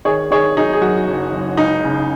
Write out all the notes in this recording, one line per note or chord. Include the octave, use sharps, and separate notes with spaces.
D#3 G#4 C#5
D#3 G#4 C#5
F#3 D#4 G#4
G#4
F#2 F#4
F#1
F#1
C#2 D#4
C#3